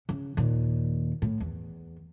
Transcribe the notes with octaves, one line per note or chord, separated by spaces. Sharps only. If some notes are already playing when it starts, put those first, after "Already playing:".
C#3
D#2 A#2
A2
E2